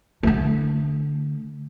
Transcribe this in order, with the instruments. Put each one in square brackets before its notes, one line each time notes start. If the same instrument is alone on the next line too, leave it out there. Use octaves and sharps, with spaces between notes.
[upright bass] D3 A3